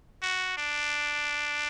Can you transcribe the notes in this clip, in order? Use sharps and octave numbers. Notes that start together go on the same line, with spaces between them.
F#4
D4